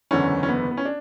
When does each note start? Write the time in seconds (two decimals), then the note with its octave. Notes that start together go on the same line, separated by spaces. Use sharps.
0.11 F#1 E2 D3 C#4
0.43 C#4
0.49 B3
0.71 B3
0.77 C#4
0.85 D4